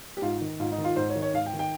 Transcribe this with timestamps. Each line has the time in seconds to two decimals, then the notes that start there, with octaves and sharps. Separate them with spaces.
0.17 G4
0.22 G#2 F4
0.41 D#3
0.60 G#2 F4
0.72 D#4
0.78 D#3
0.84 F4
0.96 G#2 C5
1.09 C#5
1.16 D#3
1.22 C#5
1.33 G#2 F5
1.46 G5
1.53 D#3
1.59 G5